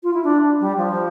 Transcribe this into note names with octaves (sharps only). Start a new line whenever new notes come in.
F4
E4
D4
G3
F3